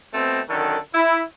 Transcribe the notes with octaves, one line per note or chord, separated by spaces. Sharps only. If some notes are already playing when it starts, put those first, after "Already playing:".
B2 A3 C4
F#2 D3 D#3 A4
E4